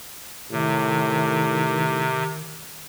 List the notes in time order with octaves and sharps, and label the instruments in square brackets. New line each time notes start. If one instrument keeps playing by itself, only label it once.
[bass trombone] A2 [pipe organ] C3 [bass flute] D#3